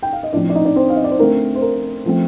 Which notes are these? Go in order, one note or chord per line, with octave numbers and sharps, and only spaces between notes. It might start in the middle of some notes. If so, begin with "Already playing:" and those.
G5
F5
D#5
A2 F3 C4 D4 D5
D5
D#4 D#5
D4 D5
C4 C5
F5
D#5
D5
C5
D3 A3 C4 A#4
C5
A#4
F3 A3 C4